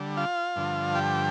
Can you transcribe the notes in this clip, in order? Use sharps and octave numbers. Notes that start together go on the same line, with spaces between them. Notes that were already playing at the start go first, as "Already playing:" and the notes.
Already playing: D3 G3
F4 F5
G2 D3 F3
G4 G5